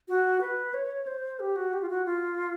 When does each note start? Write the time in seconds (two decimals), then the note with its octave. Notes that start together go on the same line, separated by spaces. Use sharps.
0.08 F#4
0.41 B4
0.74 C#5
1.07 C5
1.40 G4
1.56 F#4
1.73 G4
1.82 F4
1.89 F#4
2.06 F4